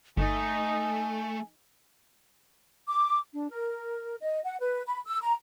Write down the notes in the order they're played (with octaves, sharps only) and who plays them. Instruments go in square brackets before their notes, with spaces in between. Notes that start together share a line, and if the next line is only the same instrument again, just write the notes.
[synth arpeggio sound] G1 [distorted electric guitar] A3 [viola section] D#4 [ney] G#5
[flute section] D6
D4
A#4
D#5
F#5
B4
B5
E6
A#5